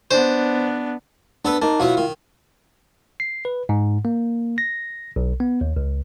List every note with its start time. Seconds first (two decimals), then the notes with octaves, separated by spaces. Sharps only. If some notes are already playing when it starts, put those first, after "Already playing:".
0.11 B3 D4 C5
1.45 B3 D4 A4 B4
1.62 A#3 D#4 A5
1.80 B2 F#3 B3 E4 F4 F5
1.97 D#3
3.20 C7
3.45 B4
3.69 G#2
4.05 A#3
4.58 A#6
5.16 B1
5.40 B3
5.61 D#2
5.76 C#2